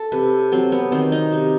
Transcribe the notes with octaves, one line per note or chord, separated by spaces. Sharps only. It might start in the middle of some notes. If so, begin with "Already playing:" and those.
Already playing: A4
C3 B4
F#3 C4
B3
D#3 C4
D#4
C3